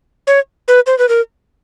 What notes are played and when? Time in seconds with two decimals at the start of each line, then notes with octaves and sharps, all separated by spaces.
0.27 C#5
0.68 B4
0.87 C5
0.99 B4
1.09 A#4